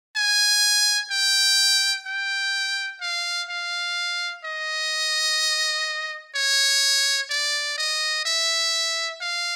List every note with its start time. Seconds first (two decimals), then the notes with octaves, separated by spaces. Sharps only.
0.16 G#5
1.11 G5
2.06 G5
3.01 F5
3.49 F5
4.45 D#5
6.35 C#5
7.30 D5
7.78 D#5
8.25 E5
9.21 F5